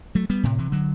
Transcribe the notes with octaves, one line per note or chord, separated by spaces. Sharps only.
F#3 A3
G3 B3
A2 C3
C3 E3
D3 F#3